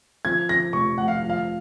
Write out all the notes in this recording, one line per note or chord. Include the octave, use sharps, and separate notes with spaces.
F3 G#6
F3 A#6
F1 C#6
F1 F#5
F5
F3
F5